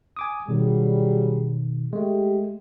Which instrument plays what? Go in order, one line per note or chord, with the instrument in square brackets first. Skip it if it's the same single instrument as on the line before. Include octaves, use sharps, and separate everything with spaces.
[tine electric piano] G#5 D6 D#6
[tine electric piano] B2 D#3 [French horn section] F#3 G3 G#4
[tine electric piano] G#3 A3 [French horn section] G4